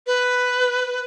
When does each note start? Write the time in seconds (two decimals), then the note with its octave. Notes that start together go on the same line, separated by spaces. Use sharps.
0.07 B4